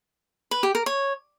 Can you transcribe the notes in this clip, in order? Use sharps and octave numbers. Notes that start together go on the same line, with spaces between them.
B4
G4
A#4
C#5